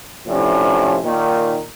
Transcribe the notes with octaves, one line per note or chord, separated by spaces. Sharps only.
A2 C3 F3 C#4 D4
A#2 D#3